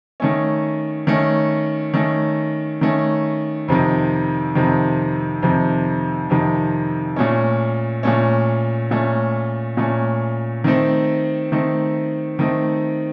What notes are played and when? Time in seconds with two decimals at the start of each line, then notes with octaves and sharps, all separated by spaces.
0.20 D#3 A3 C#4
1.07 D#3 A3 C#4
1.94 D#3 A3 C#4
2.81 D#3 A3 C#4
3.68 F2 C3 D#3
4.55 F2 C3 D#3
5.42 F2 C3 D#3
6.30 F2 C3 D#3
7.16 A#2 A3 C#4
8.03 A#2 A3 C#4
8.91 A#2 A3 C#4
9.77 A#2 A3 C#4
10.64 D#3 A3 C4
11.52 D#3 A3 C4
12.39 D#3 A3 C4